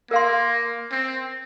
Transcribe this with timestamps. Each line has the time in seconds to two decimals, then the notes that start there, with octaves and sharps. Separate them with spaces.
0.11 A#3 A#4 F5 C6
0.92 C4